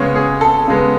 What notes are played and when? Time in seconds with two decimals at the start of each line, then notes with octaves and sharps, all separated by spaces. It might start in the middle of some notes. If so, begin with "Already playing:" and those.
Already playing: C#3 G#3 B3 C#5
0.15 G#4
0.41 A4
0.68 C#3 G#3 B3